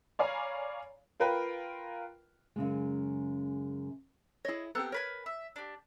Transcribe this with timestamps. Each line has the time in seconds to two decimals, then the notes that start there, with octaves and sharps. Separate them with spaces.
0.19 C#5 D5 F5 G#5 A#5 B5
1.20 F4 A#4 B4 G5
2.56 F#2 C#3 G#3
4.45 E4 G#4 C#5 D#5
4.75 B3 C4 G4 A4 A#5 F#6
4.92 A#4 B4 C#5 G#5
5.26 E5
5.56 D4 G4